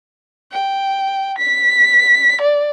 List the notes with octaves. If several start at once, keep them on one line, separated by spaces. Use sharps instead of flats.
G5
B6
D5